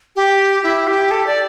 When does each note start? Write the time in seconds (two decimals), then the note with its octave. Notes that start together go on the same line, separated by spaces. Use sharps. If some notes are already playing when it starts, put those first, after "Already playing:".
0.16 G4
0.63 E4
0.87 G4
1.11 A4
1.27 D5